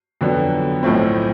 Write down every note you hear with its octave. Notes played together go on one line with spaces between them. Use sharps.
F2 D3 F#3 B3
B1 A2 F3 A3 C4